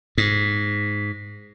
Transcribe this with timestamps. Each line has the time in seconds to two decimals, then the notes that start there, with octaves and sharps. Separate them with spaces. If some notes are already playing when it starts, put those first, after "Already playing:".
0.18 G#2